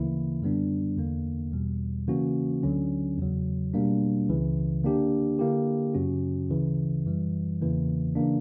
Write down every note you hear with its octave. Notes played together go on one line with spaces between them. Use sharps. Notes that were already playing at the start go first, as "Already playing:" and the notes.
Already playing: D2 C#3 E3 A#3 E4
F#2 D3 G3 B3 D4
E2 D3 A#3
E2 B2 G3
C#3 E3 A#3 C#4 F#4
D2 D3 F#3 C#4
E2 C#3 F#3
B2 G3 A#3 D4
C#2 C#3 E3
D3 A#3 D4 G4
D3 A#3 E4 G4
F#2 C#3 F#3 C#4 F#4
D2 C#3 E3
F#2 E3 G3
E2 C#3 E3 A#3
C#3 E3 A#3 D4